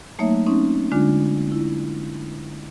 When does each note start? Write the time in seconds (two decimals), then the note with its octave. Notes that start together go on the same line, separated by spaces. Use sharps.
0.19 F#3 A3 A#3 D#4 C#5 E5
0.47 C4 C#4 D#4
0.92 D3 G#3 D4 F4
1.52 E4